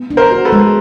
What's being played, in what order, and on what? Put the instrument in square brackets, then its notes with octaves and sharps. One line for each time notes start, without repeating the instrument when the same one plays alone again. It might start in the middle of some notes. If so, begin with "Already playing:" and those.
Already playing: [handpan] B3
D4
[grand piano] A#4 C5
[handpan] F#4
[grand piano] A4 B4
[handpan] G#3